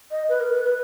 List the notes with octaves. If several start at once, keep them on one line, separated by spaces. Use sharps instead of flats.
D#5
B4
A#4
B4
B4